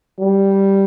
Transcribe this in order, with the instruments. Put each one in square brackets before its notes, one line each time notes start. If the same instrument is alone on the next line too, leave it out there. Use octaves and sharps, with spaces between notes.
[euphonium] G3